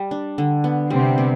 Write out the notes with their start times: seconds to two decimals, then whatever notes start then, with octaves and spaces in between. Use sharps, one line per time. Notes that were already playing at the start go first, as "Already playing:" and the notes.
Already playing: G3
0.11 D4
0.38 D3
0.64 B3
0.90 C3 G3 C4
1.18 B3